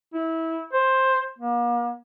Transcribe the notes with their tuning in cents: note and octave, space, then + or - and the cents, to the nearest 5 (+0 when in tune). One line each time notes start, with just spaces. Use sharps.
E4 -20
C5 +10
A#3 +40